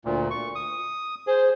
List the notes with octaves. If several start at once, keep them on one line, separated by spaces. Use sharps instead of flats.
D2 A#2
C#6
D#6
G#4 C5